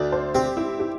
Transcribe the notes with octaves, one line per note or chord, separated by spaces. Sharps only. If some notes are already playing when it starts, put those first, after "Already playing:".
Already playing: D2 D5
C5
C4 G4
E4
G4